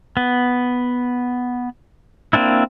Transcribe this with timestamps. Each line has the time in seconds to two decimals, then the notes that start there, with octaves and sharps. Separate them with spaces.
0.17 B3
2.33 A#3 C4 D4 E4